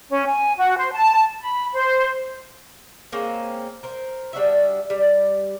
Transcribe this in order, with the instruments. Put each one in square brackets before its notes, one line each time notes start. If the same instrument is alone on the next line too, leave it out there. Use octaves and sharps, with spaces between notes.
[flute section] C#4
G#5
F#4
C5
A5
B5
C5
[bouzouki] G#3 A#3 C4 C#4
A#4 C5
G3 D4 F#4 E5
G3